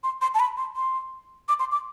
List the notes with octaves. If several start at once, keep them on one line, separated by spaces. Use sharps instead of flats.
C6
C6
A5
B5
C6
C6
D6
C6
D6